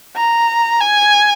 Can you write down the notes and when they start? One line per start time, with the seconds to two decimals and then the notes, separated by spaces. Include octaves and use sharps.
0.16 A#5
0.80 G#5